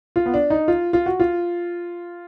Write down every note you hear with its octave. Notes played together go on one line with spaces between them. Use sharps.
F4
B3
D4
D#4
F4
F4
F#4
F4